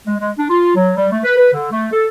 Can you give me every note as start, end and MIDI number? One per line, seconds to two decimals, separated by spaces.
0.07 0.15 56
0.21 0.31 56
0.38 0.46 62
0.50 0.73 65
0.76 0.92 54
0.97 1.07 55
1.12 1.19 57
1.24 1.36 71
1.38 1.53 71
1.54 1.72 50
1.72 1.88 57
1.92 2.08 69